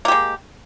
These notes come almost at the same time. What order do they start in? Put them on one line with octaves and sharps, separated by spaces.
A#3 G4 G#3